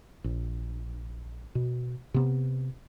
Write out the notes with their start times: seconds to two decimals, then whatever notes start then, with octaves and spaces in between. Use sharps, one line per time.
0.24 A#1
1.55 B2
2.14 C3 B3